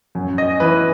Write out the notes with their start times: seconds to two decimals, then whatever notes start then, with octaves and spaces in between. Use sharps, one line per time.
0.15 F#2
0.38 D#5
0.60 E3 B4